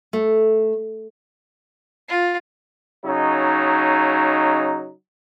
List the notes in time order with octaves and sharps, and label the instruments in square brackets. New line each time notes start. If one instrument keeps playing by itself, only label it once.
[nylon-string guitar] A3
[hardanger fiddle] F4
[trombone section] C#3 F#3 D#4